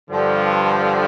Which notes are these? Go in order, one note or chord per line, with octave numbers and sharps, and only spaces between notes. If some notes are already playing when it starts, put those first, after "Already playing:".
G2 D3 F3